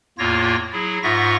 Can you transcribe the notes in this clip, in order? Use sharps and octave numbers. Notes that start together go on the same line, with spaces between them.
E2 A2 A#3 F4 C#5 A#6
F#3 E4 G#4
G#2 F4 E5 F#5 C#6 A#6